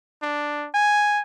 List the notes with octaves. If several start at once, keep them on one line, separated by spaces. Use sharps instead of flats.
D4
G#5